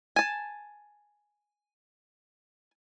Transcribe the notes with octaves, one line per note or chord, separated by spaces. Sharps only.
G#5 A5